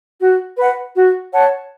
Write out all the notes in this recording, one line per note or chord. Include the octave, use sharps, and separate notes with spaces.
F#4
B4 F#5
F#4
C#5 F#5 A5